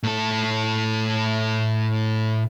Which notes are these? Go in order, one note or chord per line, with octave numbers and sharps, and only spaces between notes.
A2 A4